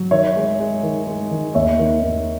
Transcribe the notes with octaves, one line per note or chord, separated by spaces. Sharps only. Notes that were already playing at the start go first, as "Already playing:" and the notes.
Already playing: F#3
D#3 C#5 E5
G#3
G#3
D#3
G#3
D#3
D#2 C#5 E5
D#3
D#2